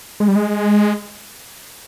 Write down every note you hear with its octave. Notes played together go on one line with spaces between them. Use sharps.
G#3
G3
G#3